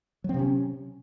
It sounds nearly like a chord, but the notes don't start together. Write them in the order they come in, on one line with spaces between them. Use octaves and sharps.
F#3 C4 C3 C#4